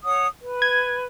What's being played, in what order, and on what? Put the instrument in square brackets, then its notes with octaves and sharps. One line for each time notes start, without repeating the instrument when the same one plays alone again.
[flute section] C#5 F#5 D#6
B4
[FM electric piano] G#6